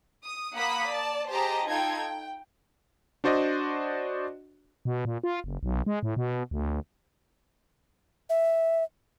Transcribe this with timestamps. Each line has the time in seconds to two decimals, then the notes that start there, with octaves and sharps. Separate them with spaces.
0.24 D#6
0.56 A#3 F#5 B5 D#6 B6
0.91 D5 A5
1.32 G4 G#4 C5 D#5 A5 A#5
1.69 D#4 F4 A4 G5 G#6
1.98 G5
3.24 D4 F#4 C5 D5 D#5
4.85 B2
5.05 A#2
5.24 F4
5.44 F#1
5.63 B1
5.86 G#3
6.03 A2
6.17 B2
6.51 D2
8.30 E5